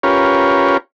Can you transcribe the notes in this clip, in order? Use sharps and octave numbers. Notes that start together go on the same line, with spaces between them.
C#4 F4 G4 A#4 B4 C#5